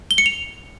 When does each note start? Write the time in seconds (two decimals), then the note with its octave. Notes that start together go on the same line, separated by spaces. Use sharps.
0.11 G7
0.18 C#7
0.26 F7